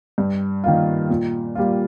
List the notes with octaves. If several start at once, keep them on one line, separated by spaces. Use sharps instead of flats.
G2
D#3 A#3 F4
A#2
G3 A#3 F4